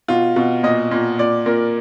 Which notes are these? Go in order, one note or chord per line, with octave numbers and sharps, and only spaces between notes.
B2 F4
B2
A#2 D#5
A#2
A#2 D5
A#2 A#4